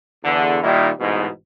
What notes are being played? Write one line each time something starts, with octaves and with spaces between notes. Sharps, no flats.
E2 D3
A#2 D#3 G3 A#3 D#4 E4
A1 G#2 B2